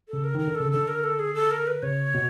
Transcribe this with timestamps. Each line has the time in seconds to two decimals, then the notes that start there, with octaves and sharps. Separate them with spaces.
0.08 C#3 A4
0.24 A#4
0.35 D#3 A#4
0.47 D3
0.55 A4
0.60 C#3
0.72 D3 A4
0.88 A#4
1.04 A4
1.19 G#4
1.35 A4
1.51 A#4
1.67 B4
1.83 C#3 C#5
2.14 B2